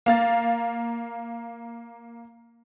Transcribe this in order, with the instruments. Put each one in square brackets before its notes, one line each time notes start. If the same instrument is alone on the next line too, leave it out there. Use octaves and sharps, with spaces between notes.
[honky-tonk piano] A#3 F5 A6